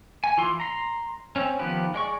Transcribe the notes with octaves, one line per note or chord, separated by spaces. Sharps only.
G#5
E3 F4 C6
A#5 C6
C4 C#4
D#3 F3 B3 G4 B4
G#3 D5 C#6